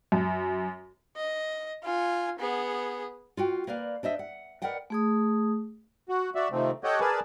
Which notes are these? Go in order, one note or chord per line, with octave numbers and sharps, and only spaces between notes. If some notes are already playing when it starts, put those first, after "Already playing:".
F#2
D#5
F4 G#5
B3 G#4
F4 F#4 G5
A#3 B4 D5 F5
D4 C5 D#5 E5
F#5
A#4 B4 D5 D#5 F#5 G5
A3 G#4 D#6
F#4
F#4 D5 E5
C3 D#3 F3 A3 C4
G4 A4 C#5 D#5 F#5 G5
G#4 A#4 B4 D5 G#5 A5